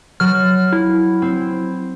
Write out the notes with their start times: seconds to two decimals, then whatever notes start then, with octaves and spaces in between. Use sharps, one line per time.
0.20 F#3 F6
0.73 E4
1.22 C4